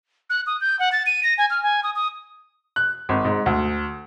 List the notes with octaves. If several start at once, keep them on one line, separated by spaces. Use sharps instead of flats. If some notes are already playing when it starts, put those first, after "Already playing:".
F#6
D#6
G6
F#5
A6
D#7
A#6
G#5
F6
G#5
D#6
D#6
F#6
G#1
G#2
D2